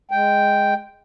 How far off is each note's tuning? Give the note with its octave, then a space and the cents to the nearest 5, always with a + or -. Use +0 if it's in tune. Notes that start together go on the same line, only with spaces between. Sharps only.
G#3 +0 G5 +0